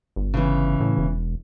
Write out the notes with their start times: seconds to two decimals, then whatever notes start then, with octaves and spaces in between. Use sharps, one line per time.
0.16 G1
0.34 C#3 E3
0.80 A2
0.97 E1